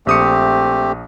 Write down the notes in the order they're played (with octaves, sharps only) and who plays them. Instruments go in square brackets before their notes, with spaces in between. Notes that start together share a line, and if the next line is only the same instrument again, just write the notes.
[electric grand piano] A#1 D#6 C#7 [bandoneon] A3 C4 G4